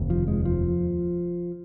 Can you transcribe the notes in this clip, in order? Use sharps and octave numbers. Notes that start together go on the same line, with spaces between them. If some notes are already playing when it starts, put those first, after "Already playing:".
Already playing: F1 D#2
F3
G#3
F3